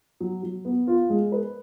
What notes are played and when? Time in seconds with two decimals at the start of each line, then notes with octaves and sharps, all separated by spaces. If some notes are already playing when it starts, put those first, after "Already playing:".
0.20 F#3
0.43 F#3
0.65 B3
0.87 F4
1.10 G#3
1.32 B4